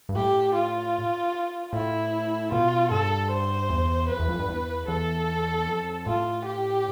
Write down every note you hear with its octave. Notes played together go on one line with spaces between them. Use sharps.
G2
A2 G4
F4
A2 E4
B2 F4
G2 A4
C5
E2
F2 B4
E2
F2
G2
E2
E2 A4
F2
A2 F4
G4